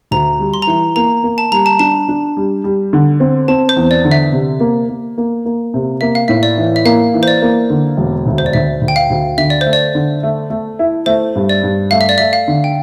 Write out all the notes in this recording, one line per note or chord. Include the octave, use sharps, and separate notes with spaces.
D2 A#5
G3
C6
A#5
E3 C6
A#3 A#5
A#3
A5
G3 A#5
A5
D4 A5
D4
G3
G3
D3
C4
C4 A5
C5
E2
D5
D3
E5
C3
A#3
A#3
A#3
A#3
C3
A#3 E5
F5
A2 E5
D5
E3
E5
A#3 F5
E3
C5
D5
A#3
D3
E1
D2
C5
D5
D2 E5
D2
G5
F5
D2
D3 E5
D5
C5
A3
D5
D3
A3
A3
E4
A3 C5
G2
D5
G2
A3 F5
E5
D5
A3 E5
F5
D3
G5